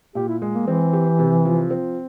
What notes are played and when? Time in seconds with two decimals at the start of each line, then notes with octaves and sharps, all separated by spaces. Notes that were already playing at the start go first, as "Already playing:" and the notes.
0.15 A#2 G4
0.28 E4
0.42 G#3
0.55 A#3
0.67 E3 C4
0.93 G4
1.19 C3
1.45 F3
1.71 C4